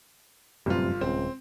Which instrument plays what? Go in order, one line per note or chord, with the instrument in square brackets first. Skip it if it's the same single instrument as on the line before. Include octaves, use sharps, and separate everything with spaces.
[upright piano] G1 F4 [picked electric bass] F#2 A2 G3 [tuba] C3
[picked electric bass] D#1 [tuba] C#2 [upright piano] C4